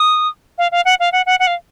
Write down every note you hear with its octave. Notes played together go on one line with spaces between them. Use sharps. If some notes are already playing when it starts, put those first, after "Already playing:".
Already playing: D#6
F5
F5
F#5
F5
F#5
F#5
F#5
F5